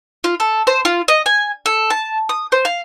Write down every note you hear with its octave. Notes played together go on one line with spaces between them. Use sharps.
F4
A4
C5
F4
D#5
G#5
A4
A5
D#6
C5
F5